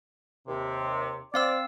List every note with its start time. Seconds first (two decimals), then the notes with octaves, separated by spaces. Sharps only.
0.48 D#2 C3
1.34 C4 C5 D5 F5 E6